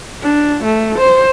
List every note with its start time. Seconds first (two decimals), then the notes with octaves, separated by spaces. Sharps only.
0.23 D4
0.64 A3
0.98 C5